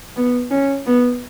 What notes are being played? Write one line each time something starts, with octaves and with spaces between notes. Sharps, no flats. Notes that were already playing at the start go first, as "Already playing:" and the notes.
B3
C#4
B3